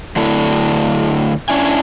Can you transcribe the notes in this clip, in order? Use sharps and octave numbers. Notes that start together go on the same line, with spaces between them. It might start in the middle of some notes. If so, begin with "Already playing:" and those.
D3 F#3 A3 D4 E4 A4
C#4 D4 E4 G#5